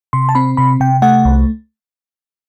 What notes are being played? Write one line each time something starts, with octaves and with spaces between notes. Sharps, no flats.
C3 C6
A5
C4 B5
C3 B5
C3 G5
A3 F#5
C2